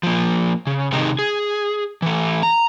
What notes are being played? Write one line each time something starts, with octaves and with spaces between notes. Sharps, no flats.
F3 A#3
C#3
C3 D#3 G#3 D#4
G#4
E3 A3
A#5